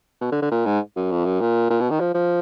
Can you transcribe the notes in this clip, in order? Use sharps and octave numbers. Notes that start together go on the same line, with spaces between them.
B2
D3
D3
A#2
G#2
F#2
F2
F#2
A#2
A#2
B2
D#3
F3
F3